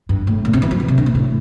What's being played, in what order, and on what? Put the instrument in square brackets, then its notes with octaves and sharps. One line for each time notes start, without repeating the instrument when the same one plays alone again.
[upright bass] G2
A2
A#2
C3
E3
F3
E3
C3
D3
A#2
A2